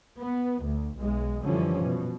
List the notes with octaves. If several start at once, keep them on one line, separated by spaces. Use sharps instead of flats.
B3
D2
B1 G#3
F#2 D3 E3 F3 G3 C#4
B2